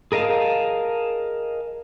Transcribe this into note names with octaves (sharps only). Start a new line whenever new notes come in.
G#4 A#4 D#5 F5 A5